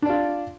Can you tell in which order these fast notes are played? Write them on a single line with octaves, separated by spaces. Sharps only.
D4 D5 F4